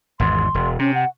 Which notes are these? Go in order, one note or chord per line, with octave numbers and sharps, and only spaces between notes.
G#1 E2 G#2 C6
E1
C3 C#4
F#5